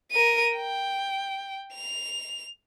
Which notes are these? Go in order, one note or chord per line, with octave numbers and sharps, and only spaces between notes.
A#4 D#7
G5
F7